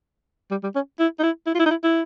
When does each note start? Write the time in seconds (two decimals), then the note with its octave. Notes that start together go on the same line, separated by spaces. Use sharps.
0.51 G3
0.63 G3
0.75 C#4
1.00 E4
1.19 D#4
1.23 E4
1.46 E4
1.55 F4
1.59 E4
1.66 D#4
1.70 E4
1.83 E4